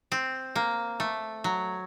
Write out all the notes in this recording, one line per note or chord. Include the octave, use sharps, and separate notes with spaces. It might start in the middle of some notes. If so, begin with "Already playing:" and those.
C4
A#3
A3
F#3